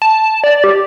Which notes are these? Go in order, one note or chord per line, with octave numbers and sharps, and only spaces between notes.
A5
D5
G4